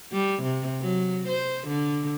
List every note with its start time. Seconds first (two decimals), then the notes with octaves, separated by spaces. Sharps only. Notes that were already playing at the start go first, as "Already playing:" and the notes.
0.13 G3
0.43 C3
0.81 F#3
1.28 C5
1.68 D3